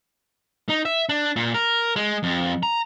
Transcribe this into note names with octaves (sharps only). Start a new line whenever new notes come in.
D#4
E5
D4
A#2
A#4
G#3
F2
A#5